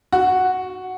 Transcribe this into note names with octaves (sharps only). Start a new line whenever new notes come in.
F#4